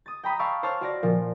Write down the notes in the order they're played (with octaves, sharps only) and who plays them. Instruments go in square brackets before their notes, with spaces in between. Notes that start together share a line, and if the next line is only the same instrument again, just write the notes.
[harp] D#6 A6
G5 A#5 B5 D#6
F5 A5 B5 C#6 D6 E6
C5 C#5 A5 E6 F6
F#4 D5 A#6
A#2 F3